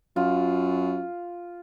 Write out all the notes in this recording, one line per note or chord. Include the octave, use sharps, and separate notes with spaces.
F#2 F4